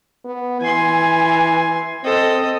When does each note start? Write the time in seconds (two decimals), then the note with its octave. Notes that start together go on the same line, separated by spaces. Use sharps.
0.25 B3
0.61 E3 G#5 C6
2.04 C4 A4 D#5